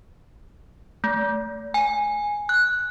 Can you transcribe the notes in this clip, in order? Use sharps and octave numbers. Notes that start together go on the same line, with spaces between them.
A3
G#5
F#6